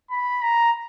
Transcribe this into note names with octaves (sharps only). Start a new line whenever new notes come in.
B5
A#5